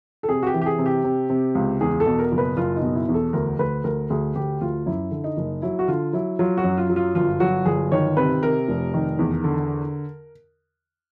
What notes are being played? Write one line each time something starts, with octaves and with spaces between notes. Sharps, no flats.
A4
C3 G#4
F#4
G4
E3
G4
G#4
C3
G4
C3
C3
C#2
E2 G#4
A4
B2
A#4
F#1
B4
F#1 F4
D#4
B2
E4
E2
A4
D2 A#4
D2 B4
D2 A#4
D2 G#4
D2 G4
D2 F4
F#2 E4
D3
D#4
F#1
F#3 E4
F#4
D3 F4
F#3 E4
F#3 F4
F#4
F#2
F4
F#3
F4
G1 F4
F#3 F#4
G1 G#4
D#3 C#5
C3 B4
C3 A#4
F1
D#3
E2
D3